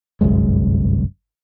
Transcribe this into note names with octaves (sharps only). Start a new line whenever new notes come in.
G1 C2 F#2 G#3